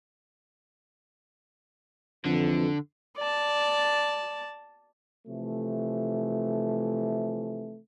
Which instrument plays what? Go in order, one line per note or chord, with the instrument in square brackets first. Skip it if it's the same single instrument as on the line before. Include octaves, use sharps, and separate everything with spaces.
[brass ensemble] F2 E3 [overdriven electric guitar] D3
[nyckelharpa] D5 A5
[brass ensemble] C3 E3 F3 A3